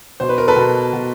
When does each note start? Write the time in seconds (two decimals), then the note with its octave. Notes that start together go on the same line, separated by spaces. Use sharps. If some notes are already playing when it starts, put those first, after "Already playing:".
0.20 B2 C5
0.29 B4
0.38 A#4
0.48 A4 B4
0.56 B2
0.93 B2